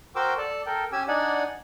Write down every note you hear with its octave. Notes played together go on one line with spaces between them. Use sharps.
F#4 A#4 C5 G5 D6 E6
A4 D5 A5
A4 A#4 G5
C#4 G4 G#5 E6
D4 D#4 D5 F#5 G#5